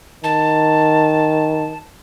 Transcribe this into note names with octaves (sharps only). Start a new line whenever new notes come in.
D#3 A5